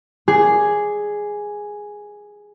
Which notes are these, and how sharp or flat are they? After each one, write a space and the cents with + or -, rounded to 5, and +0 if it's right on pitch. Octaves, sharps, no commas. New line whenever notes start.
G#4 +0 D5 +0